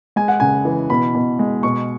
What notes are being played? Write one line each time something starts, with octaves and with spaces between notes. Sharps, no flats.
G#3 G#5
F#5
C#3 G#5
E3
B2 B5
B2
G#3
B2 C#6